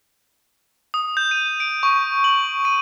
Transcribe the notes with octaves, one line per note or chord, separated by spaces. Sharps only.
D#6
G6
D#7
D7
C#6
F#7
D#7